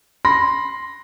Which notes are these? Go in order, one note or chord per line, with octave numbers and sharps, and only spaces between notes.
B5 C6 A#6